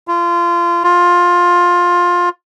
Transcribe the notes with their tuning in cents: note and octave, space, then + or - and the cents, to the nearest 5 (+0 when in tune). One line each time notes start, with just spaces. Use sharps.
F4 -25
F4 +15